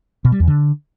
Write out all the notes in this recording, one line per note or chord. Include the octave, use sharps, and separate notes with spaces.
B2
G3
E2
D3